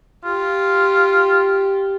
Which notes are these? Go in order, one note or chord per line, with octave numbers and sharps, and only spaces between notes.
F4 G4